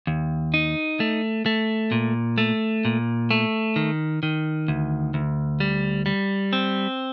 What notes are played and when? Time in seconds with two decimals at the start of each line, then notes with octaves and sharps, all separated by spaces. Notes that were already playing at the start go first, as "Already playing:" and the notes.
0.07 D#2
0.54 D#4
1.00 A3
1.46 A3
1.92 A#2
2.38 A3
2.85 A#2
3.31 A3
3.76 D#3
4.23 D#3
4.68 D2
5.14 D2
5.60 G3
6.06 G3
6.53 C4